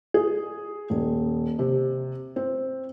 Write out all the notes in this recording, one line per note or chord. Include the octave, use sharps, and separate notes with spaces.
G#4
D#1
C3
C4